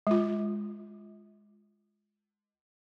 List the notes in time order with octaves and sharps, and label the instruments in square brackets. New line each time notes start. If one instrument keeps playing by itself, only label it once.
[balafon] G#3 F4